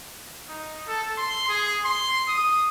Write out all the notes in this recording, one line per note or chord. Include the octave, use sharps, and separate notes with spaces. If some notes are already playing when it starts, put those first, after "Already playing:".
D#4
A4
C6
G#4
C6
D#6